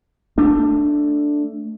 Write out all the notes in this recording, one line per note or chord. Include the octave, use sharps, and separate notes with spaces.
A3 D4